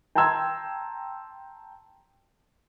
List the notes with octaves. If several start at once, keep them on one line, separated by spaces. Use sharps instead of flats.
G5 A5 A#5 C6 E6 G#6